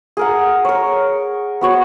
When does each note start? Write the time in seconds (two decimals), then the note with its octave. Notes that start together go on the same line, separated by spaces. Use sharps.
0.17 G#4 A#4 F#5
0.65 A#4 C#5
1.61 B3 F#4 C#5